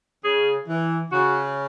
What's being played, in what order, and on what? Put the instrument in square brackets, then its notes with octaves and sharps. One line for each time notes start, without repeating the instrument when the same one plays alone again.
[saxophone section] C#3 [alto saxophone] G#4
[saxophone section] E3
[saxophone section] C#3 [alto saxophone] F#4